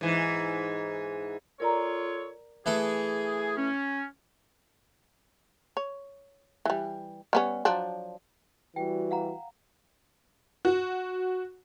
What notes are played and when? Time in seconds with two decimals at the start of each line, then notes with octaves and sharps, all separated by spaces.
0.01 G#2 E3
1.60 F4 A4 A#4 C#5 D5 A#5
2.66 E3 A3 G#4 A4
3.57 C#4
5.77 C#5
6.65 E3 G3
7.33 G3 B3 C#4
7.65 F3 F#3 D4
8.76 E3 G3 F#4 G5
9.11 F5 F#5 A#5
10.65 F#4